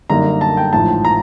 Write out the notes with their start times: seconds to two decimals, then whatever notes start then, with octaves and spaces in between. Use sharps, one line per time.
0.10 F#2 D3 G3 A#3 D#4 A#5
0.41 A5
0.57 G5
0.73 A1 G#2 F3 A5
1.05 A#5